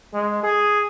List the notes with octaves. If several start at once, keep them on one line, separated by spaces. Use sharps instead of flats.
G#3
G#4